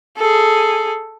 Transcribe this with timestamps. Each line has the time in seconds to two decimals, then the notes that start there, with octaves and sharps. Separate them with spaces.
0.17 G#4 A4